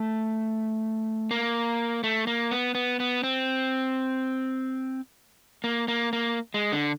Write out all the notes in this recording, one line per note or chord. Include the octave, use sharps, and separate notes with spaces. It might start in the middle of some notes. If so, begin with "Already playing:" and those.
Already playing: A3
A#3
A3
A#3
B3
B3
B3
C4
A#3
A#3
A#3
G#3
D3